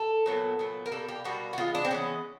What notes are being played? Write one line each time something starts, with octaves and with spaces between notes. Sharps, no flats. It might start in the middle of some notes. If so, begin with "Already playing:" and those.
Already playing: A4
A#2 F#3 B3
A#2 F#3 B3
A#4
B2 G3 A#3 A4
G4
B2 G3 A#3 F#4
F#4
E3 G#3 B3 F4
D4
C4
E3 G#3 B3 C#4